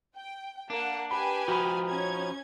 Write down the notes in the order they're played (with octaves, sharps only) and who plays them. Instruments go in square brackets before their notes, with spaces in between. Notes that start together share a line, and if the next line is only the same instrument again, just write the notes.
[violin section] G5
[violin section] A#3 F#5 [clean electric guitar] D4
[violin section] G4 B4 G#5 [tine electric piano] B5
[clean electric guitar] F3 D#4 [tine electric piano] F#4 B5
[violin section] C#4 G#6